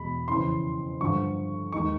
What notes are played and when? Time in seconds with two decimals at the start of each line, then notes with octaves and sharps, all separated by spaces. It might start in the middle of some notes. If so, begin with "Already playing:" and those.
Already playing: E2 B2 G#3 B5
0.28 F2 C#3 E3 C6
1.00 G2 D3 F3 C#6
1.72 D#2 D#3 G#3 C#6